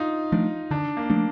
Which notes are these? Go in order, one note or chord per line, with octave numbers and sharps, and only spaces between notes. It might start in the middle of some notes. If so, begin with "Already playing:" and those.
Already playing: D#4 F4
F3 A3 D4
D3 D4
A#3
F3 A3 D4